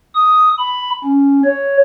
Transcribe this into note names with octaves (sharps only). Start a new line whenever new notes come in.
D#6
B5
C#4
C#5